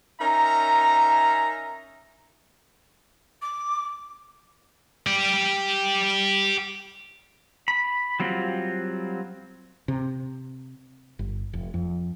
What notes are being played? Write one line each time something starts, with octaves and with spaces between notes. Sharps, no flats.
C#4 D#4 A#4 E5 A#5
D6
G4 D5
B5
F#3 G3 C4 F4 F#4
C3
G1
F1
F2